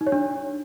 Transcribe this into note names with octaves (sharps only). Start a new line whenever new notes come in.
D#4
C#5
D4